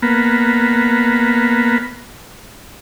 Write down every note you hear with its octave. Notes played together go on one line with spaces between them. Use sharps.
A#3 B3